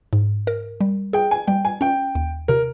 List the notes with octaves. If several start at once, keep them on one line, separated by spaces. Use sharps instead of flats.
G#2
A#4
G3
G#4 G5
G#5
G3 G5
G#5
C#4 G5
D#2
C3 A#4